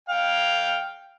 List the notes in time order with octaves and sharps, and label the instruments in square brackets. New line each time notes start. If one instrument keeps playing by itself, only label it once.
[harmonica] F5 G5